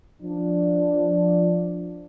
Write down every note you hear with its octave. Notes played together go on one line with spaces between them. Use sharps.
F3 D4